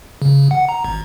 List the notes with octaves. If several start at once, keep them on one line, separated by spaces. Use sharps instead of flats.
C#3
F#5
A#5
G#1